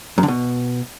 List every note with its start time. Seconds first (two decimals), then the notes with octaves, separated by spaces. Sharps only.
0.18 F#2
0.23 D3
0.28 B2